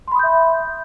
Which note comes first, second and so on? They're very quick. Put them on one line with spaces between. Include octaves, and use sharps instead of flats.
C6 B5 D#6 G6 E5